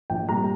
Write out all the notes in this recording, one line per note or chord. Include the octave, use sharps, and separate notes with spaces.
A#1 G5
A#2 G3 C4 A#5